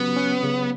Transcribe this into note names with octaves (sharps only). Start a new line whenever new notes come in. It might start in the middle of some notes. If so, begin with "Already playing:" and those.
Already playing: C#3 F#3 B3 C#4 G4
C#4
C#3